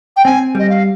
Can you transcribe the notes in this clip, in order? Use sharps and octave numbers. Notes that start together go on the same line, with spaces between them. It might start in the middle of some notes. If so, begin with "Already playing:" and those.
G5
C4 G#5
G3 D#5
F5